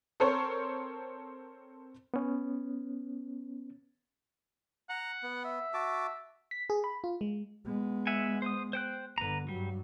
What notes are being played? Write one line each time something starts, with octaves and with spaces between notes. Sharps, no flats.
C4 A4 A#4 C5 C#5
B3 C#4
F#5 A#5
B3
E5
F#4 A5 D6
B6
G#4
B5
F4
G#3
G#3 B3
E5 F#5 G#5
C5 D#6
C5 G5 F#6
G1 D3 B4 A#5
G2 F#3 G3